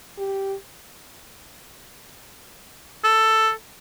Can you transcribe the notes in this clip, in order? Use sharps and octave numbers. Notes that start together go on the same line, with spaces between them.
G4
A4